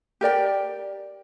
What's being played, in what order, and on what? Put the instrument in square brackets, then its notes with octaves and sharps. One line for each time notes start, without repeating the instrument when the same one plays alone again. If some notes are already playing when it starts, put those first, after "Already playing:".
[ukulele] G4 A#4 D5 G5